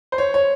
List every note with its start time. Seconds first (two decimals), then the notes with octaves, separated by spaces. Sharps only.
0.12 C5
0.18 C#5
0.34 C#5